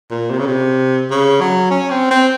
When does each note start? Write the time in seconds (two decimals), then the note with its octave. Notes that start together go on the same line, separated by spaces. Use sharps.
0.11 A#2
0.31 C3
0.39 C#3
0.46 C3
1.11 C#3
1.41 F#3
1.70 C#4
1.91 C4
2.11 C4